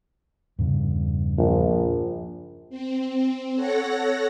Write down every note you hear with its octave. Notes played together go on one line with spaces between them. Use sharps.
E2 G2 C#3
A#1
C4
A4 C#5 F#5 A#6